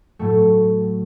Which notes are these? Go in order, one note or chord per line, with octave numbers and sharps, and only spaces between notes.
A2 F#3 A3